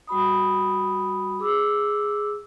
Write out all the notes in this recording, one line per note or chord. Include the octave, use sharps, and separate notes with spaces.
G3 F#4 B5 D#6
G#4 D6 E6